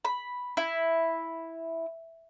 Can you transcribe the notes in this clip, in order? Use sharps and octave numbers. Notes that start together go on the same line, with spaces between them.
B5
E4